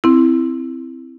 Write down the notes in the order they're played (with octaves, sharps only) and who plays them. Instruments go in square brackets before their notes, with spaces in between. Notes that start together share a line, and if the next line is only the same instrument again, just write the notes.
[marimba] C4 E4